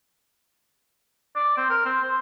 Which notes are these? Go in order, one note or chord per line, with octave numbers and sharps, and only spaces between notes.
D5
C4
A#4
C4
C5